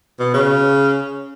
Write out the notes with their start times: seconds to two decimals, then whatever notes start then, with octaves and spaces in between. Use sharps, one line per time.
0.20 B2
0.34 C#3